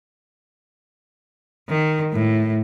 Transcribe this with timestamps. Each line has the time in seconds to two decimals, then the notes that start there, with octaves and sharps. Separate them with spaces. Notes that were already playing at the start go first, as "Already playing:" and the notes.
1.69 D#3
2.13 A2